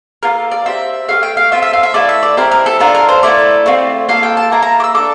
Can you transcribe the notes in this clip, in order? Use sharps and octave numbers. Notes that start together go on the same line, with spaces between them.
A#3 F4 A4 A#4
D5
C4 G4 E5
A3 E4 G4 F5
G5
F5
C4 F4 A4 E5
E5
F5
E5
A3 E4 A4 D5
E5
D5
C4 E4 G4 A#4
A#4
A4
D4 F4 A4 A#4
A#4
C5
A3 E4 A4 D5
A3 C4 F4
A#3 F4 A4 F5
G5
A5
A#3 E4 A4 A#5
A#5
D6
E6
D4 A4 D6